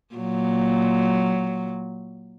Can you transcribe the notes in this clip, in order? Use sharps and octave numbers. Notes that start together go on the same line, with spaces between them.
A#2 F#3